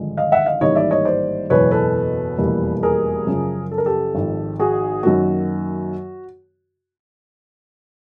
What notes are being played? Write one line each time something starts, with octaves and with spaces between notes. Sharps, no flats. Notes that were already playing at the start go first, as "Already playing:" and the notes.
Already playing: G#1 G2 D3 F3 G#3
D#5 F5
E5 F#5
D#5 F5
A1 G#2 D#3 G3 A#3 C#5 D#5
D5 E5
C#5 D#5
C5 D5
F#1 E2 B2 G#3 B3 B4 C#5
A4 B4
F1 E2 B2 G3 A#3
G#4 A#4
F#2 C#3 F3
A4
A#4
G4 A4
G#1 G#2 F3
F#4 G#4
F#2 D#3 F#3 A#3 F#4